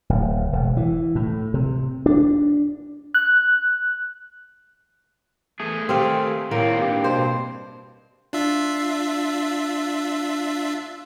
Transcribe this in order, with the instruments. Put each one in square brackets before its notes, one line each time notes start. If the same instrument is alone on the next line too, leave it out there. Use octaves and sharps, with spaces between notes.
[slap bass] D1
E1
E3
A2
C3
D4
[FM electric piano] F#6
[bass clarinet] E3 [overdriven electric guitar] A3 G#4
[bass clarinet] D#3 [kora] C4 G4 F5
[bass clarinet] A2 [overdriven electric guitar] D#3 C4 [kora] A#3
[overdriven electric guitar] G2 [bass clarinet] G4
[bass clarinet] B2 [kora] C5
[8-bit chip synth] D4 F4 E5